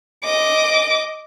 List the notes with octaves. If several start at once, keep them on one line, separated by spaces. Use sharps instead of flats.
D#5 D6